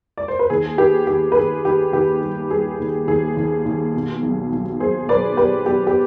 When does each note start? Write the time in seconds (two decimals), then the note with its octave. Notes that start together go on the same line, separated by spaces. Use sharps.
0.17 D5
0.28 C5
0.39 B4
0.50 D#2 G#4
0.78 D#3 G4 B4
1.07 D#3 G4
1.32 B4
1.36 D#3 G#4
1.64 D#3 G4
1.93 D#2 G4
2.22 G3
2.51 G3 G#4
2.80 D#2
3.08 D#2 G#4
3.37 D#2
3.65 D#2
3.94 B2
4.23 B1
4.52 B1
4.80 B1 G#4 C5
5.09 B1 B4 D5
5.37 B1 G4 B4
5.66 B2 G4
5.87 G4